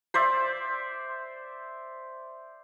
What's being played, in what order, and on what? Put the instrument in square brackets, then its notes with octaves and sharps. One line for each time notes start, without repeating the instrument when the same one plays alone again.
[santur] C5 D5 E5